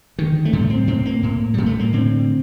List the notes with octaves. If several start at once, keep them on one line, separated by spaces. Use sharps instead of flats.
D3 D#3
A3
A2 G3
C4
A2 C4
A#3
A2
A2 G3
A3
A#3
D3 C4